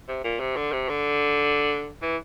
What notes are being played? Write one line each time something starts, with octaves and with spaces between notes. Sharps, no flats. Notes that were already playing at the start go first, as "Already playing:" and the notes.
C3
A#2
C3
D3
C3
D3
E3